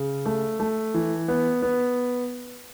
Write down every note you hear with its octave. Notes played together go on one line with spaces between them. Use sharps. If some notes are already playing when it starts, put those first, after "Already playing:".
Already playing: C#3
A3
A3
E3
B3
B3